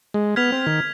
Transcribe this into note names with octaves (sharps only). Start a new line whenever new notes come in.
G#3
B3 F6 G#6 B6 F7
C4
D#3